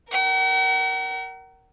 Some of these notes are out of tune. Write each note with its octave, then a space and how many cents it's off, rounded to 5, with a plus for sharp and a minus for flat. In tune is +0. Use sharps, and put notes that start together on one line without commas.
A#4 +0 F#5 +45